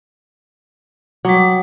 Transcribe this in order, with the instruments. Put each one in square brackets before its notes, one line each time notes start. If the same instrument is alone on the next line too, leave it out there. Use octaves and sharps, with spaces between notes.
[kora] F#3 [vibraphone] G3 D6 D#6